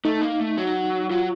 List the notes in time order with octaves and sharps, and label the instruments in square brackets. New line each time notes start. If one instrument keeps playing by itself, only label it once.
[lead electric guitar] A3 [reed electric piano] D#4
[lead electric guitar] A#3
A3
F#3
[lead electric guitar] F#3 [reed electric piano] F4